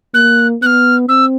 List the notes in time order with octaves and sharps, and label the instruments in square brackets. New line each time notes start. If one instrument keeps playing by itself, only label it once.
[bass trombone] A#3 [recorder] F#6
[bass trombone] B3 [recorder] F#6
[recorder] F6
[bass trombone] C4 [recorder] E6